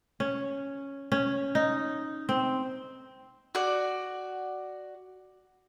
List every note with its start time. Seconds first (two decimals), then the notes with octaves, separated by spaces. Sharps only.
0.20 C#4
1.12 C#4
1.55 D#4
2.29 C4
3.55 F#4 D5